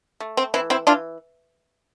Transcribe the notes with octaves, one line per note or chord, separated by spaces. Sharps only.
A3
C4
E3 C4 E4
C4 E4
E3 D4 F4